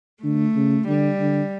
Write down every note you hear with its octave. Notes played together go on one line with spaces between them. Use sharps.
D3 A3
C#3
D3 G3
D3